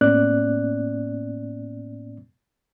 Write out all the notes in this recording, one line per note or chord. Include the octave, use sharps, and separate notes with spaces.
A2 A#3 B3 C#4 D5 F#6